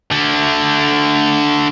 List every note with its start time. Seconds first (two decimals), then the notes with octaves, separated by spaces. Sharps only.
0.11 D3 A3